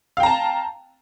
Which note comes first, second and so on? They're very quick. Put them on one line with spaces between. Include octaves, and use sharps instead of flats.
F5 G5 A#5 A5